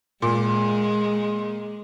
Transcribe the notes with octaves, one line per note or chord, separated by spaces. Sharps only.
A#2 G#3